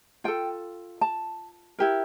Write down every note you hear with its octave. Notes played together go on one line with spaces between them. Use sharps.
F4 A4 G5
A5
E4 G4 A#4